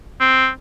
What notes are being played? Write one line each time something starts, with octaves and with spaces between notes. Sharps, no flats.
C4